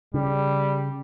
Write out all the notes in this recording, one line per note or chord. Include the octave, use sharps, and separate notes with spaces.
C#3 G3